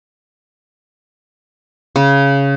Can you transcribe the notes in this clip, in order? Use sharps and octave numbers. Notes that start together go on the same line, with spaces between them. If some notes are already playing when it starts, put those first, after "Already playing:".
C#3